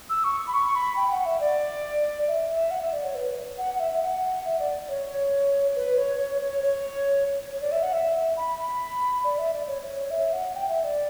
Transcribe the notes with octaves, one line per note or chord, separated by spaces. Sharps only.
E6
C#6
B5
C#6
B5
G5
F#5
E5
D5
E5
E5
F#5
E5
D5
C#5
B4
F#5
F#5
E5
E5
F#5
E5
D5
C#5
B4
C#5
C#5
C#5
C#5
C#5
D5
E5
F#5
E5
B5
B5
D5
E5
D5
C#5
C#5
C#5
E5
F#5
G5
E5
D5